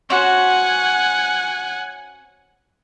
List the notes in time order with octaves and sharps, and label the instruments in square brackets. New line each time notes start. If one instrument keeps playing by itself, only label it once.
[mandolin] C#4 F#4 C5 [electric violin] F#5 G#5